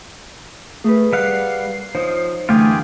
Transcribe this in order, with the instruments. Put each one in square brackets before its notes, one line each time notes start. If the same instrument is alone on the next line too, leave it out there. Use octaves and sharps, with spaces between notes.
[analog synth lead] A3 [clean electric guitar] G#4 A#4 B4
[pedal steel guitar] G3 F5 F#5 [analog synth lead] C7
[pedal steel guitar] F3 [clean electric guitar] D#4 C5 C#5
[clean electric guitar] F#2 D3 E3 [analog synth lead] A3 [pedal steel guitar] F4 G4 G#4